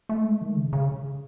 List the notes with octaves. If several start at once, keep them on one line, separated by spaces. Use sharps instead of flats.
A3
G#3
D#3
C#3
C#3